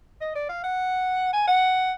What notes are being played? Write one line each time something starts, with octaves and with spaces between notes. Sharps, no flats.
D#5
D5
F5
F#5
G#5
F#5